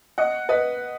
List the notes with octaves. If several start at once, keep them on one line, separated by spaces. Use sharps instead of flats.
D#5 F#5
B4 D#5